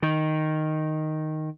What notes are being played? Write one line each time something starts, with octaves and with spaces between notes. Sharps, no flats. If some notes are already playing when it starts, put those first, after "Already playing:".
D#3